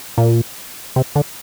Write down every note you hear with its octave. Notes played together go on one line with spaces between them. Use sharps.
A#2
C3
D3